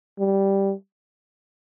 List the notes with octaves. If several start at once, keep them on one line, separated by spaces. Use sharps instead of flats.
G3